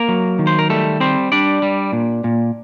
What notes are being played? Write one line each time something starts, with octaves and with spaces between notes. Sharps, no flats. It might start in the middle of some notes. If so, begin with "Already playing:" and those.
Already playing: A#3 A#4
F#3
D#3
C5
A#4
G3 A3 A4
G3 C4 C5
G3 D4 D5
G3
A#2
A#2